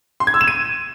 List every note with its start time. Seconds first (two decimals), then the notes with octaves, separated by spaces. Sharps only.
0.20 C6
0.27 G#6
0.34 E6
0.41 E7
0.48 D#7